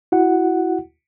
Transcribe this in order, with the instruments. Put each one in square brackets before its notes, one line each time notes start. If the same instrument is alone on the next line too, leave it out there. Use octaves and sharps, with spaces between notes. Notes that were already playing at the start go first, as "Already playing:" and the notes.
[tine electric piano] E4 F#4 F#5